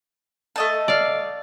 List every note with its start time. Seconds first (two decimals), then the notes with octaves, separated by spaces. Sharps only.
0.56 A3 D#5 A5
0.88 D5 F5